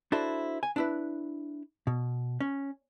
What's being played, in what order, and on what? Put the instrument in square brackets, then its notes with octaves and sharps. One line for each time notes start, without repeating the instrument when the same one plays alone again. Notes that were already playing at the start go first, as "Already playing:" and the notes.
[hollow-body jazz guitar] D4 E4 F#4 A4 C5
G#5
D4 E4 B4
B2
C#4